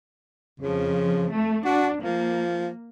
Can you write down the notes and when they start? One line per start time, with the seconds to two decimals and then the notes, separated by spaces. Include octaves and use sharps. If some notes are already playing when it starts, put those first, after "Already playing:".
0.60 F2 C#3 F3
1.31 A3
1.65 D4 F#4
2.03 F3 A#3